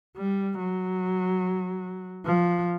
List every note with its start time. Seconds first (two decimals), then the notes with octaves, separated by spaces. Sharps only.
0.17 G3
0.59 F#3
2.26 F3